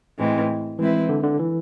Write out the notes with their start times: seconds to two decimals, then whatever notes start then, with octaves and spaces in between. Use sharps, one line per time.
0.19 A2 E3 G#3 C4
0.78 E3 G#3 C4 E4 B4
1.09 D3
1.23 D3
1.39 E3